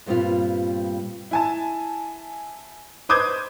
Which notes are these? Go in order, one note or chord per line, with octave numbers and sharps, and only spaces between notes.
G2 A#2 G3 B3 C4 F4
E4 G#5 A5
B4 C5 D6 D#6 G6 G#6